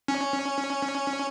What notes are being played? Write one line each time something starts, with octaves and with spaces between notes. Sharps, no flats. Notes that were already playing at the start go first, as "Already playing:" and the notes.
C#4